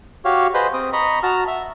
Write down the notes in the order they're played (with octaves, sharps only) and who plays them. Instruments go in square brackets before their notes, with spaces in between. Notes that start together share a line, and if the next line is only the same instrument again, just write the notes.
[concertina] F#4 G4 C#5 F5
G#4 B4 C5 D#5
C4 D#6
D#5 A#5 B5 C#6
F#4 A5 A#5 F6
E5